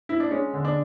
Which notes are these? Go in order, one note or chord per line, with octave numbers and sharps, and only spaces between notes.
E4
D4
G#3 C#4
D3
D4